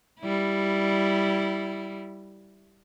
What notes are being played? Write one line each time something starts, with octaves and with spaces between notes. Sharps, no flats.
G3 E4